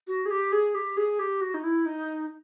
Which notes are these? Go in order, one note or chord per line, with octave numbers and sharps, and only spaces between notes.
F#4
G#4
G4
G#4
G4
G#4
G4
F#4
D#4
E4
D#4